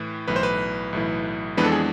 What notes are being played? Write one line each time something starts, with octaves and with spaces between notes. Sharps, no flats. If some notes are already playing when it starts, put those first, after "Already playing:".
Already playing: A2 E3
B1 A2 E3 B4
C5
B4
B1 A2 E3
F2 E3 G#3 B3 D4 B4
A4
G#4